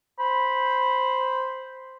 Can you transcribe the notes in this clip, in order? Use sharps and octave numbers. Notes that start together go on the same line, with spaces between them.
C5 B5